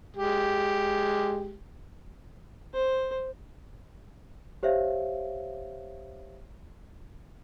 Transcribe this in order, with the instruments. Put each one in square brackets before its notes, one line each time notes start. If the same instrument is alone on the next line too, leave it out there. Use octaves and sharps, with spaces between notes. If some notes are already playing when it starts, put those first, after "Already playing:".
[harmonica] G#3 G4
[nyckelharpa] C5
[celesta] G4 C5 C#5 E5 F5